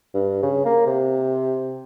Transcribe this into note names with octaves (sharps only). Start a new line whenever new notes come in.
G2
C#3
A#3
C3